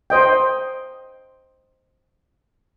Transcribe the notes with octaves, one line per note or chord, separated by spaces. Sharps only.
C5 D#5 G5